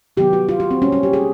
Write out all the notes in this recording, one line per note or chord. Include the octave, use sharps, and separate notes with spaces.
C3 D#3 F#3 B3 G4
F#4
F4
F#4
C4
A#2 G3 A#3 C#4
C#4
G4
G#4